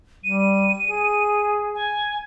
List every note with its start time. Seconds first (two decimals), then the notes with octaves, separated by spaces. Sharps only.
0.24 G3 D#7
0.88 G#4
1.75 G#5